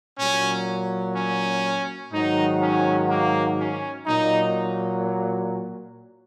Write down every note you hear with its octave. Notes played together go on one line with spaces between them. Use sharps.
A#2 F#3 C#4
C#4
G#2 D#3 F#3 D#4
C#4
A#3
C#4
A#2 F#3 D#4